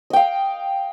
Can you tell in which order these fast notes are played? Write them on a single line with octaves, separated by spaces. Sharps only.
D#5 G5 F5